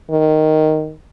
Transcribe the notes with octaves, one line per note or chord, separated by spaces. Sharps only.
D#3